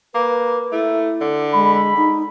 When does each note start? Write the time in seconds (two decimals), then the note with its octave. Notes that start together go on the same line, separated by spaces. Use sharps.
0.15 A#3 B4
0.72 A3 E4
1.21 D3
1.54 G#3 B5
1.97 D#4